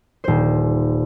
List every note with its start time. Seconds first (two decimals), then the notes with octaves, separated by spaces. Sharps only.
0.24 D#1 C5